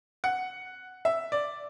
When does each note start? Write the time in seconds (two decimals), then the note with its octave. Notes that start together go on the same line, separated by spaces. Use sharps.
0.24 F#5
1.05 E5
1.32 D5